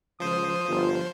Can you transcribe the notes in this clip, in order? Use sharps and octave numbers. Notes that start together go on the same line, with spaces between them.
C#2 F3 C5 D#6
G1 F4